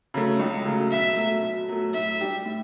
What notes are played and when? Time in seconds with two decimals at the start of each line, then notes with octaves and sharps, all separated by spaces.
0.14 C#3 F#3 A3
0.40 C#2
0.66 C#3 F#3 A3
0.91 B2 E5
1.17 F#3 A3
1.43 B2
1.69 F#3 A3
1.94 A2 E5
2.21 G3 D4 G4
2.46 A2